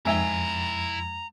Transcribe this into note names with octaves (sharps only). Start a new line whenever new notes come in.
F2 G#2 E4 E5 G5 G#5 A#5